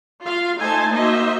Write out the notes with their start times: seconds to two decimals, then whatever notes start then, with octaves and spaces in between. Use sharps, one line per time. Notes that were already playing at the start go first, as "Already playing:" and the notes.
0.23 F4 F5
0.61 A3 D#4 C5 E5 G#5 A5
0.91 A#3 D#4 F#4 C5 D#5 E5